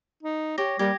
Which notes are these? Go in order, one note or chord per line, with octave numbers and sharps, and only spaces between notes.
D#4
G4 C#5 A#6
G3 A#3 G4 G#6 A#6